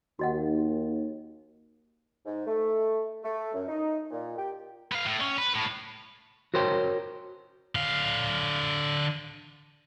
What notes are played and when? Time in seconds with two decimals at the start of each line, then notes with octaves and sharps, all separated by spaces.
0.19 D#2 F#4 D#5 F#5
2.26 G#2
2.47 A3
3.24 A3
3.54 F#2
3.68 D#4
4.11 A#2
4.37 G4
4.92 B3 F5
5.06 A2
5.21 C#4
5.38 B4
5.55 A2
6.54 F#4 A#4 C5 C#5 G5
7.75 D3 F5